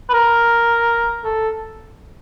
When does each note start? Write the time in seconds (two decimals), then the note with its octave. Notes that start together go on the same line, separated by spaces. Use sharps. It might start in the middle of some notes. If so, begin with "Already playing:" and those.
0.09 B4
0.13 A#4
1.24 A4